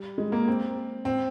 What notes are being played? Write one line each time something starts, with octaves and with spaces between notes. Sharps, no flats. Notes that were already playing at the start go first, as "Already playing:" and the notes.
Already playing: G3
G#3
A#3
C4
C4